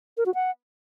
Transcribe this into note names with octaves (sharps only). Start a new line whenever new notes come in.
A#4
F#4
F#5